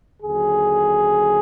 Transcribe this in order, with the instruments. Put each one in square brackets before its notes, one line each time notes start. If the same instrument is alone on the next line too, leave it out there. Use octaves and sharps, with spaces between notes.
[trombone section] D#2 D3 F#3 G#4